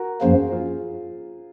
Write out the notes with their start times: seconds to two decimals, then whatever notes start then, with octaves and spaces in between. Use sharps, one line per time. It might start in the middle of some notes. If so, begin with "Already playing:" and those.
Already playing: F#4 A#4
0.21 F#2 F3 A#3 G#4 C5
0.52 F4 G#4